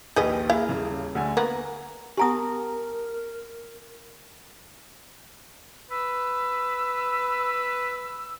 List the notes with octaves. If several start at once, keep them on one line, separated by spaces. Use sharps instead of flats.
A#1 D#2 G4 G#4 B4 D#5
A#3 E4 G#4 A#4 F5
D#1 C#3
D2 D3 G#5
A#3 B3 F#4 A#5
B3 G4 A#4 F#5 G#5 A#5 D#6
B4 E6